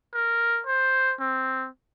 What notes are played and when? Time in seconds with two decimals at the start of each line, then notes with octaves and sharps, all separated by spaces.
0.14 A#4
0.67 C5
1.20 C4